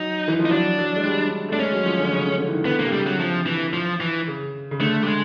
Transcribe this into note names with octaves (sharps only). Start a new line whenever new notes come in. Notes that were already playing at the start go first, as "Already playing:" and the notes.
Already playing: F#3 D#4
E3
F3
D#4
F#3 D4
F#3
G#3
G3
A3 D4
G#3 C#4
F#3
F3
D3
C#3
D3
D3
E3
D#3
D3 B3
A#3
C3
C#3 G3
F#3
F3
E3
F3
E3
C#3
C#3
D3 A3
G3
G#3